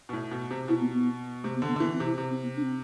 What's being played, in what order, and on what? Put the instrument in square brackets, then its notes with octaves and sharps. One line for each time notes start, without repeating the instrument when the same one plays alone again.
[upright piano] B2
A2
B2
C3
[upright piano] B2 [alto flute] E4
[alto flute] B3
B3
[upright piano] C3 [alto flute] A3
[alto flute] B3
[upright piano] D3
[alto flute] B3
[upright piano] D3
[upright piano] E3 [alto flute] B3
[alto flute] C4
[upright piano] C3
[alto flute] E4
[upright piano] C3
[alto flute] C4
B3
D4
C4